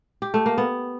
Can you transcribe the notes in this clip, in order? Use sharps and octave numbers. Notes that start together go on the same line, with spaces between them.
G4
A3
A#3
B3